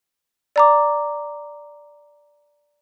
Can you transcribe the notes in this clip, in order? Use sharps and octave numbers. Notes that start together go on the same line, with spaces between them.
D5 A#5 D6